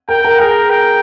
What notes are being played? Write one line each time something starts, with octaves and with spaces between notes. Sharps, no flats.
A#4 G5
A#4
G#4 A#4
G5